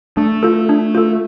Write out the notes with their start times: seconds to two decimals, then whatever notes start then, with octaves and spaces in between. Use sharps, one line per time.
0.17 A3 D4
0.43 F4 A4
0.69 D4
0.95 F4 A4